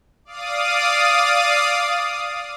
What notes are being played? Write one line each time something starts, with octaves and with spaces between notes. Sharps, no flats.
D5 F5 D#6